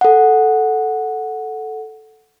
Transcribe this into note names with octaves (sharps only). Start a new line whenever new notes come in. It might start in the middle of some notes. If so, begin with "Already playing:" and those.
A4 F#5